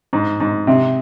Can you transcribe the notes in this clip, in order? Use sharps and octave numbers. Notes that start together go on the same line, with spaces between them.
G#2
G#2
C3